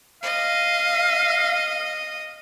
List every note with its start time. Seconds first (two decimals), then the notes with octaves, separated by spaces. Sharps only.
0.23 D#5 F5